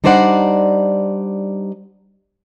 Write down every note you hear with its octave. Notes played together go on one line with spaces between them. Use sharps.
G3 D4 D#4 C5 D5 F#5